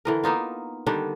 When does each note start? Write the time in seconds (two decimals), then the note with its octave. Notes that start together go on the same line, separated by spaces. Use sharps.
0.05 D3 E3 A#4
0.24 A#3 B3 D#4 F4
0.86 D3 D#3 G3 D4